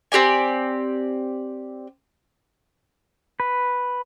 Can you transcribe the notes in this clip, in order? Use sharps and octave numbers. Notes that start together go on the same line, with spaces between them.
C4 G4 D5 G#5
B4